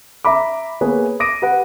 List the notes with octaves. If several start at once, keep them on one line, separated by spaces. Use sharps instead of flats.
E5 A#5 B5 D6
A#3 B3 G#4 B4 C#5
D6 D#6 A#6 D7 D#7
G4 B4 F#5